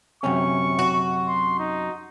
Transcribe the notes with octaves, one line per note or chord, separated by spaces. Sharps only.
F#2 C3 C#4 C#6
F#4
C6
D#4